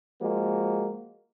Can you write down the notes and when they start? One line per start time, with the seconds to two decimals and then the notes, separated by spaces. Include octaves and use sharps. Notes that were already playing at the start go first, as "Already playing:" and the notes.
0.22 F3 G#3 A#3 F#4